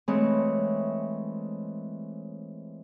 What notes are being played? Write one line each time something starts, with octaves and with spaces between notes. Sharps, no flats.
E3 G#3 A3 C4 C#5